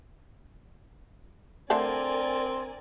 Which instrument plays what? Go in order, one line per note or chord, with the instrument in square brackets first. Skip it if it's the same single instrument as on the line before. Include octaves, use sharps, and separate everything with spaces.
[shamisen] D3 A3 A4 [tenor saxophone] C4 [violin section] A#4 D5 G#5